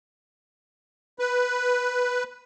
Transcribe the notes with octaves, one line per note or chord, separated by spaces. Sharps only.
B4